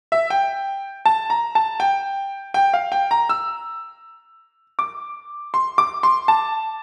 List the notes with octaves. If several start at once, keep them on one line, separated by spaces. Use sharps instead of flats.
E5
G5
A5
A#5
A5
G5
G5
F5
G5
A#5
E6
D6
C6
D6
C6
A5